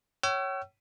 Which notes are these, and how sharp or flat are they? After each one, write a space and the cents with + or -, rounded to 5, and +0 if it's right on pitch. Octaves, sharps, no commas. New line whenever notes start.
C#5 +0 G5 -45 E6 +35